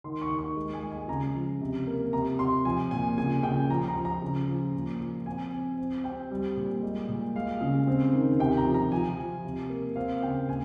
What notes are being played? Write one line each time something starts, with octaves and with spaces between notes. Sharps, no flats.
D#3 C6
C#6
D#3
C#6
G#3
G#5
G#3
G#5
C#3 A#5
F3
C3
A#3
C3 A#5
C3 C6
F3 G#5
A#2 G#5
C#3 G#5
C#3 G5
F3 A#5
A#5
F3
A#5
C#3
F3
A#2
F3
C4 G#5
C4
C4
C4 G5
G3
A#2
G#3
A#2
G#3 F5
C#3
C4
D#3
C3 G5
A#5
F3
A#5
F3 G#5
F3
C3
A#3
C4 F5
C#3 G5
A#2 G#5